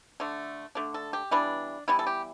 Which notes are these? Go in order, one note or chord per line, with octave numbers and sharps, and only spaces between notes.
D3 A3
D3 A3 D4
A4
G4
E3 G3 B3 D4
E3 G3 B3 E4
A4
G4